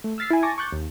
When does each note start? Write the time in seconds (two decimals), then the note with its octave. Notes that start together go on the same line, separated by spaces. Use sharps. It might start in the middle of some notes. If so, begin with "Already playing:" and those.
0.04 A3
0.18 E6 F6 A6 B6 C7
0.30 E4 G#5
0.43 G#5 A5 C#6 D6 A6 A#6
0.58 C#6 D6 F#6 G6 A6 C#7
0.72 D#2